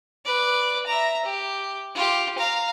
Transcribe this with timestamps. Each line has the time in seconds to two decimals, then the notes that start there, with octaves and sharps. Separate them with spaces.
0.25 B4 D5
0.87 E5 A#5
1.25 G4
1.95 F4 G4
2.38 F5 A#5